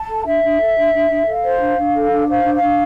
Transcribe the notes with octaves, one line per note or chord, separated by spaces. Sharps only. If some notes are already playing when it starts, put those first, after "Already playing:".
Already playing: A5
A4
D4 E5
D4
A4
D4
D4
D4
A4 F5
C5
D4
D4
A4
D4
C5 F5
D4
F5
D4